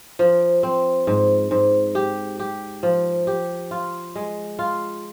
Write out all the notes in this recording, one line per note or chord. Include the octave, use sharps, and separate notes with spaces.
F3
C4
G#2
G#2
G4
G4
F3
G4
F4
G#3
F4